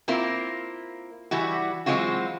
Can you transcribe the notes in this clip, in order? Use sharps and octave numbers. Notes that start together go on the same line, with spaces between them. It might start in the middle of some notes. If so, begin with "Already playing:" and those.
A#3 C4 E4 F4 A#4
E3 G3 E4 F#4
E3 F#3 G#3 C4 F4 F#4